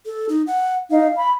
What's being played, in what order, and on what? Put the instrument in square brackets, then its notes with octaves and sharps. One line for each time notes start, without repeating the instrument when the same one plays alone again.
[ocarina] A4
D#4
F#5
[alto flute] D#4 [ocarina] F5
[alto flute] B5